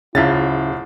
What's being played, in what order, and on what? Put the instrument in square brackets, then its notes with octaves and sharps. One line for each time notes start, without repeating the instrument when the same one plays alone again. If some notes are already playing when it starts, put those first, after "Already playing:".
[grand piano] D1 F4 A6 [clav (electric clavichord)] C#3 [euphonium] E4